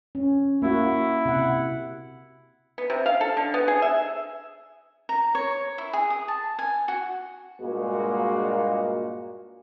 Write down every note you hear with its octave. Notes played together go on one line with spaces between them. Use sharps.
C#4
A#3 E4 F#4
C3 F#5
B3
C3
F5
A4
D3
B3
G#4
E5
A#5
C#5
E4
G#4
D#6
A5
G#5
F#4
G2 A#2 G#3 A#3 F#4